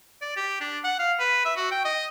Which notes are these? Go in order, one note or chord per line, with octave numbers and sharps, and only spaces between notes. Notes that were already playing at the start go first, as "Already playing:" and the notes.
D5
G4
D4
F#5
F5
B4
E5
F#4
G5
D#5